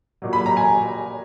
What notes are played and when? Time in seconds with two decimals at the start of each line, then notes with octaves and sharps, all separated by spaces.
0.22 A#2 F#3
0.33 B5
0.46 A#5
0.57 G#5